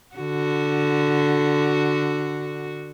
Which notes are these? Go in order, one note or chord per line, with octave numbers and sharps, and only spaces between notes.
D3 F#4